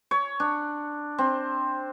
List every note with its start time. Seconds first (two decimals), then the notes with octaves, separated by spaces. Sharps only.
0.11 C#5
0.40 D4
1.18 C4